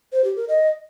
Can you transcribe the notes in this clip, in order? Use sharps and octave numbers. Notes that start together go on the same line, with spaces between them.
C5
G4
A#4
D#5